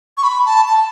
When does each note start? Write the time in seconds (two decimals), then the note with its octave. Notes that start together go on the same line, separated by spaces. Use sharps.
0.17 C#6
0.23 B5
0.46 A5
0.68 A5